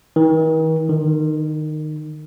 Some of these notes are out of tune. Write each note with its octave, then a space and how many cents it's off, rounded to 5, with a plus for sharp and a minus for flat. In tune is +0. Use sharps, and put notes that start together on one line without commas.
D#3 +45
D#3 -20